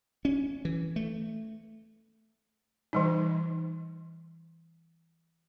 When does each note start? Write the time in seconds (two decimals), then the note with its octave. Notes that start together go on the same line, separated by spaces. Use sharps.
0.25 C#4
0.65 E3
0.96 A3
2.93 E3 G3 D#4